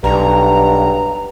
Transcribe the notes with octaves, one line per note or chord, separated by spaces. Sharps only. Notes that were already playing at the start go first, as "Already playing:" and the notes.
B1 G2 A#5